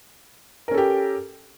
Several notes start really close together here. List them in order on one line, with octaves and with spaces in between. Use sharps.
A#4 C#4 A4 G4